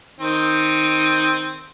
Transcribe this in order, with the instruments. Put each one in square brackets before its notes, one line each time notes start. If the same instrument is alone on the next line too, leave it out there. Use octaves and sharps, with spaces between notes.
[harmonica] D#3 C4